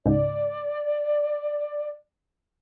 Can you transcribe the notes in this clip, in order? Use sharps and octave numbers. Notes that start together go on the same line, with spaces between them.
C#2 G#2 D5